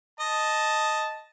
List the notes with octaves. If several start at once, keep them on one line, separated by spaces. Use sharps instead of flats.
D#5 A5